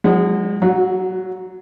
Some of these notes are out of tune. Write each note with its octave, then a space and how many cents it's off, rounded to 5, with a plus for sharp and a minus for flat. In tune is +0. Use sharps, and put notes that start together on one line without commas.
F3 +40 G#3 -25 F#5 +0
F#3 +15 F#4 -25